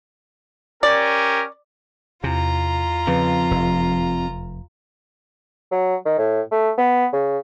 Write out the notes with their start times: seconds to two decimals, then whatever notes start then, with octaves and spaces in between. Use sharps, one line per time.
0.83 C#4 G4 A#4 D5
2.24 E2 C3 F4 A#5
3.07 F2 C#3 B4
3.51 F1
5.72 F#3
6.06 D#3
6.18 A2
6.52 A3
6.78 B3
7.13 C#3